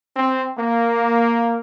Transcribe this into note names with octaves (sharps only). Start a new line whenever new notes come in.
C4
A#3